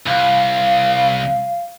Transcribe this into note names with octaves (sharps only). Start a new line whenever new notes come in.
C2 F5